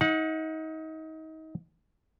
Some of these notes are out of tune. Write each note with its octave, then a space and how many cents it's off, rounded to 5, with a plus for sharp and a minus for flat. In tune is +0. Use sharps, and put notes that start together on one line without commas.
D#4 +30 F#5 -20